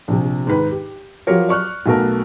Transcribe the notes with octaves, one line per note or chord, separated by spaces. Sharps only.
A#1 C3
G#2 D#3 B4
G4
F3 F#3 F4 G4 A#4 C#5
D5 C#6 F6 F#6
B1 B2 A3 A#4